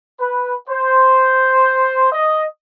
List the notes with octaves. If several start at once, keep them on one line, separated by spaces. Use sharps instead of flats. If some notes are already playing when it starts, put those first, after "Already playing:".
B4
C5
D#5